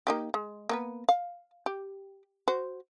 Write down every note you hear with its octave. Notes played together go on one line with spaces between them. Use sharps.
A#3 D#4 G4
G#3
A#3 B3 B4
F5
G4
F#4 C5